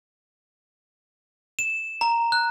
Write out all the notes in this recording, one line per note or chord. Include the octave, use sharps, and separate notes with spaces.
E7
A#5
F#6